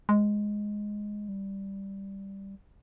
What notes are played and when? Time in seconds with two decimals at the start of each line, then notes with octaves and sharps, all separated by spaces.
0.09 G#3
1.29 G3